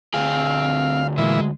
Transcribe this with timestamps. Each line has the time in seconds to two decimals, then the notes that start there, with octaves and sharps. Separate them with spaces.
0.14 D2 C4 G#4 F5 G5
1.18 A#2 E3 G#3 E5